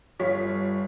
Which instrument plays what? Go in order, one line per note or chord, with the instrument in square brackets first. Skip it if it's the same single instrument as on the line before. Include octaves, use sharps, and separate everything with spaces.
[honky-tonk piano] G1 G3 F4 C#5 B6